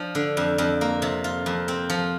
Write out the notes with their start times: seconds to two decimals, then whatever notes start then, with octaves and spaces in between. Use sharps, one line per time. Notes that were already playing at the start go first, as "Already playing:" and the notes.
Already playing: F3 D4
0.15 D3
0.37 F2
0.58 F2
0.81 A#3
1.02 C3
1.24 F4
1.46 F2
1.68 C4
1.90 F3